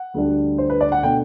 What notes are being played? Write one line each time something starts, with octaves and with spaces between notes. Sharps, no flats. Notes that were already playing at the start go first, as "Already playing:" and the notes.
Already playing: F#5
D2 D3 G3 D4
C5
B4
D5
F#5
B2 A3 D4 G5